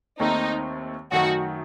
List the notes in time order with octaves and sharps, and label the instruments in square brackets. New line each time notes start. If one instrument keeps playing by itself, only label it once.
[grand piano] D#2 D#3 A3 C4 [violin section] D#4
[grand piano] F#2 D#3 A3 D#4 [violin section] F#4